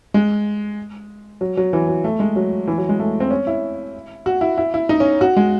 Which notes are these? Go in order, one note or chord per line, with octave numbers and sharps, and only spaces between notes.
G#3
F#3
F#3
E3
F#3
A3
G#3
F#3
E3
F#3
G#3
A3
C4
C#4
E4
F#4
E4
E4
E4
D#4
C#4
F#4
G#3